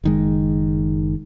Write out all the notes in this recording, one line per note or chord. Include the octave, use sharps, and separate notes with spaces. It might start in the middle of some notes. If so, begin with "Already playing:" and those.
F#1 D#3 G#3